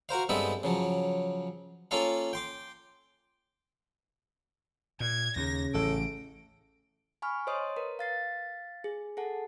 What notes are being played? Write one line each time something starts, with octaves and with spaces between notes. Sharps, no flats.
F#4 A#4 C5 F5
G2 G#3 B3 C4 A4 E5
C#3 F3 F#3
A#3 C#4 F4 A4 F5
G5 C6 D6
A#2 G#6
D#2 C#3 A#6
A1 A2 A4 D7
G#5 B5 C#6 F6
C5 C#5 D#5 C6 D#6
A#4 B4
F5 A6 C7
G#4
G#4 A4 F#5 A5